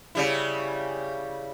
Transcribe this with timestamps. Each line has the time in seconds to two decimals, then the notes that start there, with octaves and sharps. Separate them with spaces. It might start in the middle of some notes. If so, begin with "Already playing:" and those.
0.15 C#3 G3 E4